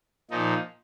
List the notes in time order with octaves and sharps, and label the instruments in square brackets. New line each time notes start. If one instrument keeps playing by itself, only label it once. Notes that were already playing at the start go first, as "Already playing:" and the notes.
[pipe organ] A#2 F3 D#4